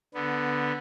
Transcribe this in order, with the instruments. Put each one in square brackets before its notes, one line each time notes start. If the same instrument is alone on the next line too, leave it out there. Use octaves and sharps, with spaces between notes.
[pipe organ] D3 B3